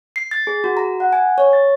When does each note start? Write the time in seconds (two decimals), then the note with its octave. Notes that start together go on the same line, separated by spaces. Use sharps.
0.16 C7
0.31 A6
0.47 G#4
0.64 F#4
0.77 A#5
1.00 F#5
1.13 G#5
1.38 C#5
1.53 A6